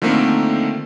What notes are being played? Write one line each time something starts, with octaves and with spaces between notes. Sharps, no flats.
D3 D#3 F3 A3 A#3 C4